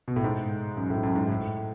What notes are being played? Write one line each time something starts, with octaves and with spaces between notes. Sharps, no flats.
B2
A2
G#2
F#2
A2
G#2
F#2
G#2
A2